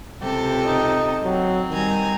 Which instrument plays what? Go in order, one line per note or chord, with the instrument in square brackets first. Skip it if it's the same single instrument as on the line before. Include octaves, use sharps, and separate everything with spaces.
[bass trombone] C#2 [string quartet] C3 G4 A4
[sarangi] D#4
[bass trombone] F#3 [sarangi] C4
[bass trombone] D#3 [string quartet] G3 G#5 A#5